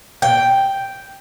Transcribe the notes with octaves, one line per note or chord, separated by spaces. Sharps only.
G5